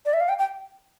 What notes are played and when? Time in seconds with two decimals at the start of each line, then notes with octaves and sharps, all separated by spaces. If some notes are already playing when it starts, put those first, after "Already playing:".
0.06 D5
0.13 E5
0.20 F5
0.29 G5
0.39 G5